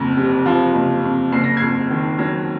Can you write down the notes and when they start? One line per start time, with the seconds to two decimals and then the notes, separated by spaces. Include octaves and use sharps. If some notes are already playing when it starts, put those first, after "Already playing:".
Already playing: F#1 F2
0.17 C3
0.46 F3
0.74 F#1
1.04 F2
1.32 F#1 C7
1.44 A#6
1.57 F2 G#6 C7
1.91 D#3
2.19 F#3